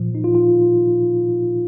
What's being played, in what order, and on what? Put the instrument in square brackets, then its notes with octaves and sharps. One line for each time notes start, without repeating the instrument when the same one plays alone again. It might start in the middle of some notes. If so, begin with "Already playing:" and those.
Already playing: [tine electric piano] A#2 F3
D#4
F4
F4